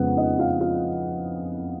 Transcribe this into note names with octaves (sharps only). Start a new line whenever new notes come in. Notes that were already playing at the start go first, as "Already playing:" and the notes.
Already playing: F2 C#3 G#3 B3 F#5
D#4 D#5
F4 F5
F4 F5